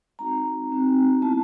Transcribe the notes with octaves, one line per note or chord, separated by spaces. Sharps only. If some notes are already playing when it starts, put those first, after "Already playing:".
G#3 C4 D#4 F#4 A#5
G#3 C4 D#4 F#4
G#3 B3 E4 A5